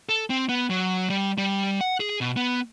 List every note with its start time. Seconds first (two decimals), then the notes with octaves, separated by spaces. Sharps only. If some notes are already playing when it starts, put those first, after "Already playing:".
0.09 A4
0.30 C4
0.49 B3
0.70 F#3
1.10 G3
1.38 G3
1.81 F#5
2.00 G#4
2.21 B2
2.36 B3